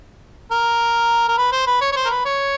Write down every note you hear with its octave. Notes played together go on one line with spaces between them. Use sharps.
A#4
A#4
B4
C5
B4
C#5
C#5
C5
A#4
B4
C#5